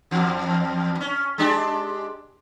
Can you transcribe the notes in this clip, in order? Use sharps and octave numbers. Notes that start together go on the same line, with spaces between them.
E2
C#4
G#3 D4 G4